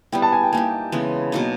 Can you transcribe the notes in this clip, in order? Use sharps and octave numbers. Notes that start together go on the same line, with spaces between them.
G3 B3 E4 G5
A5
G#5
G5
A#3 D#4 G4 G#5
C#3 E3 G#3 B3
B2 F#3 A#3 D#4